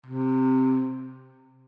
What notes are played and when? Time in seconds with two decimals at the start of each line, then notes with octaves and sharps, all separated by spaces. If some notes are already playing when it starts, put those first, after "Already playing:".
0.06 C3